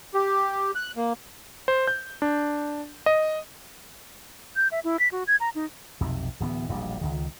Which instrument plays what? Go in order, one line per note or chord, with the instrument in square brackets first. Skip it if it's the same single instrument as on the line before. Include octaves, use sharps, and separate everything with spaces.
[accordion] G4
F#6
A#3
[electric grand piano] C5
G6
D4
D#5
[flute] G6
E5
E4
B6
F#4
G#6
A#5
D#4
[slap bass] B1 F2 C3
D1 E3 B3
E1 A#1 B2 G3
C#2 D#3